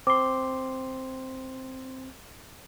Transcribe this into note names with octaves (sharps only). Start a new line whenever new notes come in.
C4 C6 D6